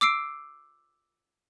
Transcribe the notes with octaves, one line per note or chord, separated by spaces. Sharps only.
D6 E6 C7 D7